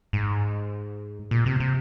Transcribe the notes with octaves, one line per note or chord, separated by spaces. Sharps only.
G#2
A#2
C3
C3